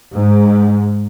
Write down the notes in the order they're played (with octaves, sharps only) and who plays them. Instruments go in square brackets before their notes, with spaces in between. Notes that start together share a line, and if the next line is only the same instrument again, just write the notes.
[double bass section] G#2